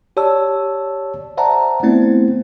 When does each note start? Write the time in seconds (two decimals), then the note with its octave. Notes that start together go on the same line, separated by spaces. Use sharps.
0.17 G4 C#5 D5 A5 E6
1.37 C5 D5 E5 F#5 A5 A#5
1.83 A3 B3 C4 E4 C5